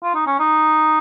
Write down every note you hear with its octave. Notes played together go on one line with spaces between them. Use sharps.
F4
D#4
C#4
D#4